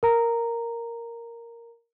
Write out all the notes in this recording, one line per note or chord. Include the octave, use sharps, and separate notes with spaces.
A#4 A#5